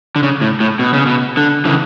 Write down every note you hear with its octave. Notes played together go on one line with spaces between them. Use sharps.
D3
C#3
A2
A2
B2
C#3
B2
D3
C#3 E3